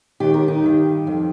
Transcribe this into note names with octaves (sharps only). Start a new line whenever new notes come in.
D#2 D#3 G4
A#4
D#4 G4
G2 D#3
F2 F3